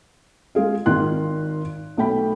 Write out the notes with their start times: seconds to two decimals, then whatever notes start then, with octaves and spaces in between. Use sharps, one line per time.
0.55 G#3 F4 G#4 F5
0.86 G#1 D#3 F4 C6 F#6
1.97 B1 A3 G5 B5